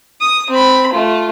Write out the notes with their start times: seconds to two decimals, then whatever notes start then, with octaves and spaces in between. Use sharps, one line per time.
0.21 D#6
0.50 C4 B5
0.93 A3 F4